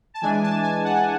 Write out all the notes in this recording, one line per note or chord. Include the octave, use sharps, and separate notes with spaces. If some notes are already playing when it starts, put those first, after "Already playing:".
A5
E3 G#3 D4 G#5
A5
G#5
F#5
G#5